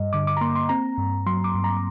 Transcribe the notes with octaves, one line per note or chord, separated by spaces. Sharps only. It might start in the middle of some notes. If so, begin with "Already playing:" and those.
Already playing: G2 G3 D#5
D3 D6
D6
A#5
A#3 C6
C6
C4 A#5
G2
F#3 C6
D6
G2
A#5